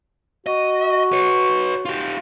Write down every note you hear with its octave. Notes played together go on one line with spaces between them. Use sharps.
F#4 D#5
B4 C#5
F4 G4